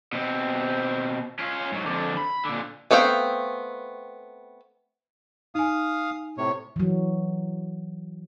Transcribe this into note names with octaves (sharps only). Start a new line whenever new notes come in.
B2 C4
C#4 F4
G#2 F#3
F2 D3
B5
A#2 D3
A3 B3 C4 F5 G5
D#4 F5 G#5 D#6
A2 C3 C#5
E3 F#3